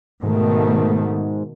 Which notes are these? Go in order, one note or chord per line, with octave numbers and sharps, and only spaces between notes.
G#2 B2 D#3 A3